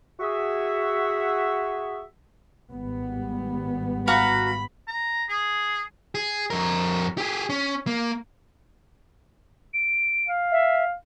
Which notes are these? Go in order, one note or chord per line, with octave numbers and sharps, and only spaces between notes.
F#4 G#4 E5
G#1 G3 B3
F#4 F5 A#5 B5
A#5
G#4
G#4
F2 A#4
G4 G#4
C#4
A#3
D7
F5
E5